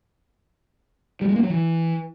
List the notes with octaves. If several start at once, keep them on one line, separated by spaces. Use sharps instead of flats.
G3
G#3
A#3
F#3
E3